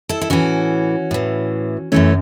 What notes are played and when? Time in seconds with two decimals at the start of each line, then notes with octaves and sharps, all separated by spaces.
0.09 E4 A4
0.21 E4
0.30 A2 E3 C#4 F#4
1.11 A2 E3
1.92 F#2 C#3 E3 A3 C#4